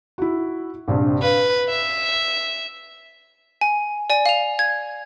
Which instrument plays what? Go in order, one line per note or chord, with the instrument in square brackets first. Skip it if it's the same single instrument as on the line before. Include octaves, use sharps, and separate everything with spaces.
[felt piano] E4 F#4
A#1 G2 C3
[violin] B4 [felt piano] F5
[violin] E5
[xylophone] G#5
D5 G#5
F5 F7
G#6